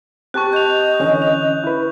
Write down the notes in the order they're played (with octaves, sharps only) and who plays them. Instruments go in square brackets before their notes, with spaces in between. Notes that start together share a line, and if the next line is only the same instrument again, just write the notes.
[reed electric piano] C4 G4 A5 [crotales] C#6 F#6
[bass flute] D#5 [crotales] G6 F7
[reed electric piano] D3 E3 C#4
[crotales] F7
[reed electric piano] E4 B4